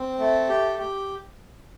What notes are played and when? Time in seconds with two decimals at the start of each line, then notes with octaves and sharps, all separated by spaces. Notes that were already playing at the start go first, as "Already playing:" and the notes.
Already playing: C4
0.19 A3
0.49 G4
0.79 G4